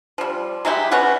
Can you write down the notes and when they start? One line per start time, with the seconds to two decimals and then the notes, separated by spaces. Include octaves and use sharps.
0.18 F3 G3
0.65 F#3 G#3 E4 G4
0.91 B3 C#4 F#4 F#5